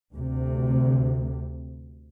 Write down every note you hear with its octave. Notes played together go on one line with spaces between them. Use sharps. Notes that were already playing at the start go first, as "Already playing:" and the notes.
D2 C3